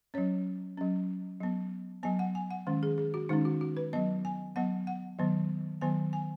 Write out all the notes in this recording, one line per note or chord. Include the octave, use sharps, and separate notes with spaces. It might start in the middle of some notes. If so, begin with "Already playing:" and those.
F#3 C#4 C#5
F#3 C#4
F#3 B3
F#3 B3 G#5
F#5
G#5
F#5
D#3 G#3 C#4
G#4
G#4
F#4
D#3 G#3 C#4 D#4
F#4
F#4
B4
F#3 B3 D#5
G#5
F#3 B3 F#5
F#5
D#3 F#3 B3
D#3 F#3 B3 G#5
G#5